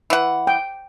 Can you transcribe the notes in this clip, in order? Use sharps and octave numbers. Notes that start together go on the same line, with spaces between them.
E3 F#5
G5